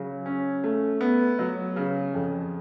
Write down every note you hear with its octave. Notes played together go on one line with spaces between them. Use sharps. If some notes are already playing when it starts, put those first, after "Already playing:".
Already playing: C#3 F#3
C#4
A3
B3
F#3
C#3
F2